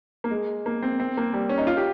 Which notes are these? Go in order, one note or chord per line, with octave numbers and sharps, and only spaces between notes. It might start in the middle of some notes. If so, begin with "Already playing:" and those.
A#3
G#3
A#3
C4
C4
A#3
G3
C#4
D#4
F4
G4